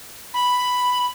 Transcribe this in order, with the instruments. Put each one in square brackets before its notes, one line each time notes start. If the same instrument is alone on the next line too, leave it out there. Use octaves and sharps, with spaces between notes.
[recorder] B5